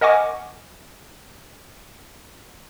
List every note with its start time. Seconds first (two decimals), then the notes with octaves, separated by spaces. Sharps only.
0.01 A#4 D#5 F#5 G#5 C#6 D6